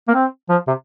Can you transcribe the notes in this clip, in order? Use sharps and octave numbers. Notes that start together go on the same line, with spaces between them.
A#3
C4
F3
C3